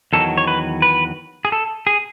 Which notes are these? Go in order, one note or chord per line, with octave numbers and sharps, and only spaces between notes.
E2 D#3 F#3 A4
C#5
B4
B4
G#4
A4
G#4